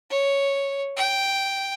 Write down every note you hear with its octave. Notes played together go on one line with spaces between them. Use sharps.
C#5
G5